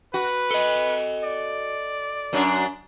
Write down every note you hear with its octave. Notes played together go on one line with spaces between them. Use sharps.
F#4 B4
A4 D#5
D5
F#2 F#3 D4